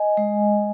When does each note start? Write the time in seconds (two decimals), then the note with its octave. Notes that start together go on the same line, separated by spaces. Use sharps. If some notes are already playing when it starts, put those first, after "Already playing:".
Already playing: D#5 G#5
0.17 G#3